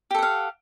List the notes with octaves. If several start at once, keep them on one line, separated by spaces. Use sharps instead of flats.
G4 A4 F5 F#5